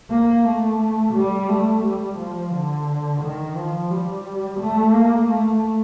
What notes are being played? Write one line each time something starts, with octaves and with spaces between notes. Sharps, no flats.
A#3
A3
G3
A3
G3
F3
D3
D#3
F3
G3
A3
A#3
A3